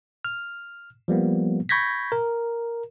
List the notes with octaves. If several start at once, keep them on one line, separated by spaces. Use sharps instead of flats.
F6
F3 G3 A#3 B3
B5 C#6 G6 G#6 A#6 B6
A#4